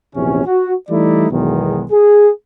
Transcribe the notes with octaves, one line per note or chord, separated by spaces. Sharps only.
A#1 E2 C3 C#4
F#4
E3 G3 A3 D#4 E4 D5
B1 E2 B2 D#3 G#3
G#4